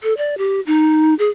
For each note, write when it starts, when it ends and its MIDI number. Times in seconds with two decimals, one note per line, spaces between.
0.03 0.14 69
0.17 0.37 74
0.38 0.60 67
0.67 1.14 63
1.19 1.29 68